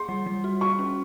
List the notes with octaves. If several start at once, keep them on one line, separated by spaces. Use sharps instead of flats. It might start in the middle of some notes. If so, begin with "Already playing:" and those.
Already playing: G#4 C6
G3
G3
F#4
F#4 C#6
C#4